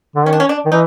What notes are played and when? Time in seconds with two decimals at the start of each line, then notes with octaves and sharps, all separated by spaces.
0.15 D3
0.26 D#3 C#4
0.33 D4
0.40 C#4
0.49 D4
0.65 D#3
0.72 E3 D#4